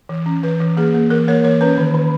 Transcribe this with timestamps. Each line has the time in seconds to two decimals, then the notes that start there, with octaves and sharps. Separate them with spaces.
0.09 E3
0.26 C#4
0.43 E3 B4
0.60 E3
0.77 A#3 G#4
0.94 A#3
1.10 E3 A#4
1.28 A#3 C#5
1.44 E3 C#5
1.61 C#4 B4
1.78 D#3
1.94 D#3